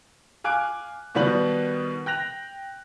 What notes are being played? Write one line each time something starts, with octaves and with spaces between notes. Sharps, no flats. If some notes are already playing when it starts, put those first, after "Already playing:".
F5 G#5 D6 F#6 D7
B2 D#3 G3 B3 B4 F#7
G5 F#6 A#6 F7